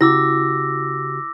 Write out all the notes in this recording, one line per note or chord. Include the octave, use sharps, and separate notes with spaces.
C#3 E4 F#4 G4 D6 E6 A#6